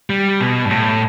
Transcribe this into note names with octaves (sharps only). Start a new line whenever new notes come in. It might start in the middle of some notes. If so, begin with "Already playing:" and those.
G3
B2
G2
A2